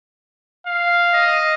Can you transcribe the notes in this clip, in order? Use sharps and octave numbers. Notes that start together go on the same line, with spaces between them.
F5
D#5